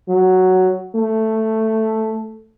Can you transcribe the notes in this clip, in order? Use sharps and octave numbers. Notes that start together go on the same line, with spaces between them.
F#3
A3